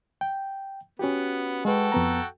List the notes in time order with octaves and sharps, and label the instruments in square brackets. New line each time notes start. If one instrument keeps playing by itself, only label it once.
[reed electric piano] G5
[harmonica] B3 [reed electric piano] C#4 F#4 G4
[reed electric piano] G#3 B4 [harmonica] F#4 A4 G5
[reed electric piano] F2 B3 A#5